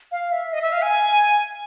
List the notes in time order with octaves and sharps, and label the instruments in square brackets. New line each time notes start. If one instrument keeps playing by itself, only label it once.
[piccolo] F5
E5
D#5
E5
F5
G#5